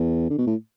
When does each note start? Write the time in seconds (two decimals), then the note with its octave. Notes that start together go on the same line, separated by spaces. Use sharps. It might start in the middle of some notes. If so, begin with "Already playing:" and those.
Already playing: E2
0.30 D3
0.38 B2
0.47 A2